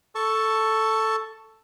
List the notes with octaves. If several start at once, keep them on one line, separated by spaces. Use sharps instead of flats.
A4 A5 C#6